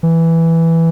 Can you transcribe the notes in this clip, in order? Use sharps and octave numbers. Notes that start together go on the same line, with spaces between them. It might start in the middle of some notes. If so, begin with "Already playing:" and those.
E3